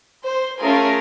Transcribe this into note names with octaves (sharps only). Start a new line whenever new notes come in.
C5
A3 C#4 F4 G#4 A#4